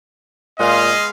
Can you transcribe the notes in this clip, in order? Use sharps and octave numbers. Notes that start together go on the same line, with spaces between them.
A#2 G#3 B3 G#4 D#5 F5